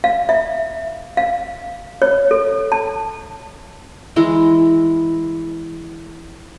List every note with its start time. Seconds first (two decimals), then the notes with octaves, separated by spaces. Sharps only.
0.04 F5
0.29 E5
1.17 F5
2.02 C#5
2.31 A4
2.72 A5
4.16 E3 G#3 E4 A#5